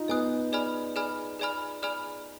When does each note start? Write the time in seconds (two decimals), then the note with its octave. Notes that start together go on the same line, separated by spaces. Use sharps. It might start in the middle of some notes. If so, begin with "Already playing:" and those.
Already playing: D#4 F4
0.08 B3 D#5 G#5 D#6 F#6
0.52 G#4 D5 G#5 B5 F6
0.96 G#4 D5 G#5 B5 F6
1.39 G#4 D5 G#5 B5 F6
1.83 G#4 D5 G#5 B5 F6